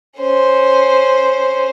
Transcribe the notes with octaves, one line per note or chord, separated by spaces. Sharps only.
C#4 C5